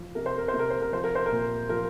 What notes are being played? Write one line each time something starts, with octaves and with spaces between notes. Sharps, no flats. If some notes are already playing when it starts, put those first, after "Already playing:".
Already playing: F3
C3 A#4
C5
A#4
C5
C3
A#4
C5
A#4
F3 C5
A#4
C5
A#2 A#4
F3 A#4